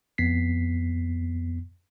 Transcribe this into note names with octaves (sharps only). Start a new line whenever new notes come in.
F2 B3 B6 C7